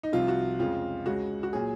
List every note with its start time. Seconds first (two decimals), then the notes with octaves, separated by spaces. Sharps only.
0.03 D#4
0.12 C2 C3 F3 F4
0.28 F#4
0.59 F2 C#3 G#3 F4
1.06 C#2 C#3 G#3 F#4
1.43 F#4
1.53 A#2 F#3 G#4